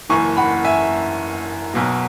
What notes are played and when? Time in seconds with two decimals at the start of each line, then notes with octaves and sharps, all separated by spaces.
0.09 F#1 F#2 E3 G#5 C#6
0.37 F#5 B5
0.65 E5 G#5
1.74 B1 B2 F#3